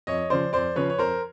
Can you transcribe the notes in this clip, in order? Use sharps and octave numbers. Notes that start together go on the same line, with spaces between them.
F2 C#5 D#5
C#3 F3 C5 D5
F2 C5 D5
C#3 F3 B4 C#5
C#5
F2 A#4 C5